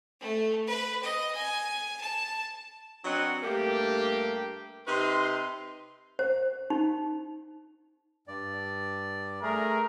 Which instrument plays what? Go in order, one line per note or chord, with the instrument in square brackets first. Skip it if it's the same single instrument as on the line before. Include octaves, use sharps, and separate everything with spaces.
[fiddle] A3
B4
D#5
G#5
A5
[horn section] F#3 C4 D4 B4 D#5 F#5
G2 A3 A#3 G4
C3 D#4 B4 C6
[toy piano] C5
D#4
[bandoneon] G2 D5
[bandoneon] A3 G#4 [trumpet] A#4